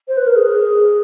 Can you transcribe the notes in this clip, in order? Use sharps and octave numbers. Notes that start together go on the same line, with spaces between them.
C5
B4
A#4
G#4